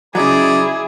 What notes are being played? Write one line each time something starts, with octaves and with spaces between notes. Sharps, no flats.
C#3 F#3 D#4 E4 G#4 B4 D5 D6